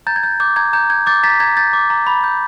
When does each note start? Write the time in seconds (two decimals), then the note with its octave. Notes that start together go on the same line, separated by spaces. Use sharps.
0.07 A#5 G6 A6
0.16 G#6
0.23 G6
0.40 D6 G6
0.56 A#5 G#6
0.73 A#5 G6
0.90 G6 G#6
1.07 D6 G6 A6
1.23 A#5 A6 B6
1.40 A#5 G#6
1.57 G6 A6
1.73 D6
1.90 A#5
2.07 B5
2.24 G6